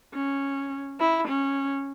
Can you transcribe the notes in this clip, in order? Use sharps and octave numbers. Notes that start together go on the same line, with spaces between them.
C#4
E4
C#4